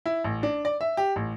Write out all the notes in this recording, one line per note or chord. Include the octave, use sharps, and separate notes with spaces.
E4
A1
D4
D5
E5
G4
A1